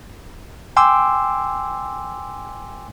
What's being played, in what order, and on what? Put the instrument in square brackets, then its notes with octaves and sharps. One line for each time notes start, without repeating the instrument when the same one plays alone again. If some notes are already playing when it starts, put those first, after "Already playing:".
[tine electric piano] G5 G#5 C6 D6 E6